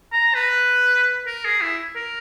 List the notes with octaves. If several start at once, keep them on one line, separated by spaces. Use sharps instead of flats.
A#5
B4
A#4
G#4
E4
A#4